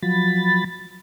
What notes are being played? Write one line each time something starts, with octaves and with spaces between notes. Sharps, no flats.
F3 F#3 B5 A6